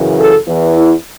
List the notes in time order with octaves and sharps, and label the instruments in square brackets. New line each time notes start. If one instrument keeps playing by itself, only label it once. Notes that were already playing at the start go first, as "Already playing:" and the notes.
Already playing: [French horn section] F#2 C#3 E3
A4
E2 E3
E4